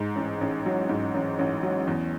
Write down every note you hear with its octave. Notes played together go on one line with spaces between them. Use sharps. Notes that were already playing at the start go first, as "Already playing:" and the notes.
Already playing: G#2
A1
A1
F#3
G#2
A1
A1
F#3
E2